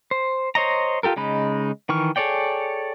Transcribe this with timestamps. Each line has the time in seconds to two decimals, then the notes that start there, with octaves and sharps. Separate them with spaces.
0.11 C5
0.55 C5 C#5 D#5 A#5
1.03 F4 G4 A4 A#4
1.16 C#3 G#3 D#4 B5
1.89 D#3 E3 C#6 F6
2.16 G#4 A4 C#5 D5 G5